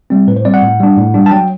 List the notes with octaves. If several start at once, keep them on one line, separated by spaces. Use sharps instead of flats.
G3 C4
A2 B4
C5
G3 C4 D5
F#5
A2
G3 D4
A2
G3 D4
A5
F#3 G5